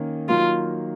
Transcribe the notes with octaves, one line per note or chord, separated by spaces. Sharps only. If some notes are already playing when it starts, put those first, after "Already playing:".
Already playing: D#3 A#3 C#4
D#3 F#3 A#3 F4